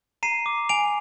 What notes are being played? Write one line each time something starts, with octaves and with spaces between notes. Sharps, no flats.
A#5 C7 D#7
D6
G#5 D7 F7